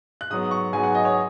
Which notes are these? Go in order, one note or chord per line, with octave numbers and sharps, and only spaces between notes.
F#6
G#2 F#3 B3 D#6
C#6
G#2 F#3 B3 G#5
F#5
D#5
C#5